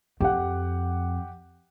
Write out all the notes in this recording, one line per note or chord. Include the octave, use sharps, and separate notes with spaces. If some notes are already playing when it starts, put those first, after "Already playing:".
F2 G4 F#5